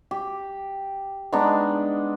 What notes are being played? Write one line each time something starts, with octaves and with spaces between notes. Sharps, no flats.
G4
G#3 B3 D4 D#4